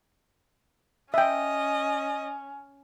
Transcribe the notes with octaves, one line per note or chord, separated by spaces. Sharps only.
C#4 D#5 E5 G5